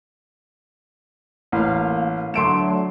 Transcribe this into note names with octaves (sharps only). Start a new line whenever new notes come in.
A1 A#3 F5
D3 F#3 A3 C6 D7 E7